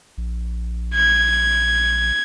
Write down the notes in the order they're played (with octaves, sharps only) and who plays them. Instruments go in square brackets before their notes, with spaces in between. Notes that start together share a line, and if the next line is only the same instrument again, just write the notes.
[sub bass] A#1
[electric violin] G#6